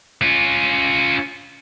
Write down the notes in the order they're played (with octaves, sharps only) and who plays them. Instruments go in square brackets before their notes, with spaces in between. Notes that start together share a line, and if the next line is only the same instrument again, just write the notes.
[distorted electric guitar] C#4 F4